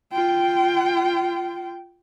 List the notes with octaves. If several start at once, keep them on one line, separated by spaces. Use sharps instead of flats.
F4 G5